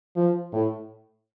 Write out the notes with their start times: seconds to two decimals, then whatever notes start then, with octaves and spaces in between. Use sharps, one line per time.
0.16 F3
0.53 A2